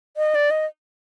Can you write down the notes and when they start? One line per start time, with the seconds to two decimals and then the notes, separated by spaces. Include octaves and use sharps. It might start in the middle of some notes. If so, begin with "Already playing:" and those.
0.17 D#5
0.35 D5
0.51 D#5